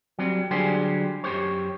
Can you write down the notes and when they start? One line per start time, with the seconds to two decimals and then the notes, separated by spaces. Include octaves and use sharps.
0.19 F#3 G3 C4
0.51 D3 F#3 G3 G4 G#4 C5
1.24 F#2 G4 C5 C#5